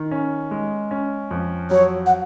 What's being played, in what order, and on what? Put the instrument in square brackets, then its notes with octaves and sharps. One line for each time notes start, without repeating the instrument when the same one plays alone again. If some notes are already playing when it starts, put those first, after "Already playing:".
Already playing: [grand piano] D#3
C#4
G#3
C#4
F2
[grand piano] F#3 [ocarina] C#5
[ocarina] F#5